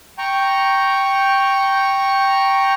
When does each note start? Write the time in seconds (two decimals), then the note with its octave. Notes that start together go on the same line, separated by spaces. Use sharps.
0.18 G5 A#5 C#6